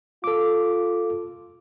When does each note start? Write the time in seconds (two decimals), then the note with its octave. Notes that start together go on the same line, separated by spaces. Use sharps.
0.24 F4 A4 D6